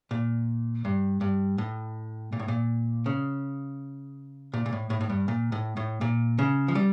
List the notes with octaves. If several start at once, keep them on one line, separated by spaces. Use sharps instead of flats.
A#2
G2
G2
A2
A#2
A2
A#2
C#3
A#2
A#2
A2
A2
A2
G2
A#2
A2
A2
A#2
C#3
F3
G3